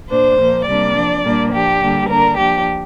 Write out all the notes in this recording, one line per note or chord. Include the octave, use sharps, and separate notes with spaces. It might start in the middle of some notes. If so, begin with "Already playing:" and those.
A#2 A#3 D4 C5
A#2 F3 A#3
C3 G3 A#3 D4 D5
F3 D4
A#2 G3 A#3 D4
F3 D4 G4
D3 G3 A#3 D4
D3 A#3 D4 A#4
F3 A#3 D4 G4